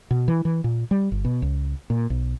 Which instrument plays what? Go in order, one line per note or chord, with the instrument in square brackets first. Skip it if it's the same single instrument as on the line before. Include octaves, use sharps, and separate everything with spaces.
[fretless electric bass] B2
E3
E3
A#2
G3
G1
B2
C#2
A#2
B1